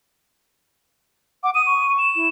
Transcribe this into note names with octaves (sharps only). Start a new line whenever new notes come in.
F#5 D6
D#6 D#7
C#6
E7
E4